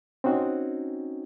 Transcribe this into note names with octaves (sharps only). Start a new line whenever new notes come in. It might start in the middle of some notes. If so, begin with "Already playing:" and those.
C4 C#4 D#4 F#4